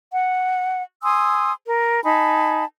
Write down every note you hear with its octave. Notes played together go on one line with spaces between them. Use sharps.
F#5
G#5 C6 D#6 E6
A#4
D#4 G#5 A5 B5